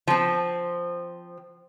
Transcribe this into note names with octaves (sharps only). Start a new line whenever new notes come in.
F3 C4